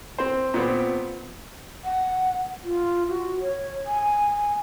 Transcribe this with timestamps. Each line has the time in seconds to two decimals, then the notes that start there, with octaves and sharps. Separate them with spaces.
0.18 C4 C5
0.54 A#2 B3 C4
1.84 F#5
2.64 F4
3.08 F#4
3.41 C#5
3.86 G#5